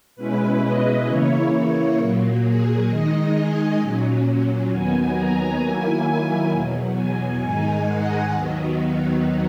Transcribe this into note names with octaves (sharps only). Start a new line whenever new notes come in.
B2 G#3 C#4 E4 B4
D#5
C#3 E3 A#3 E4 C#5
A#2 F#3 A#3
G#4
D#3 G#3 D#4 D#5
G#5
A#2 F#3 C#4
D#2 D#3 F#3 B3 G#5
A#5
D#3 F#3 A#3 E4 G#5
E2 B2 F#3
G#5
G#2 D#3 G#3 D#4 G#5
F#5
D#2 D#3 F#3 B3 D#4